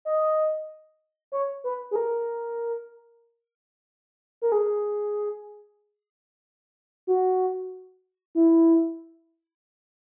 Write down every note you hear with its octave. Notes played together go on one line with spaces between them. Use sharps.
D#5
C#5
B4
G#4
A#4
A#4
G#4
F#4
E4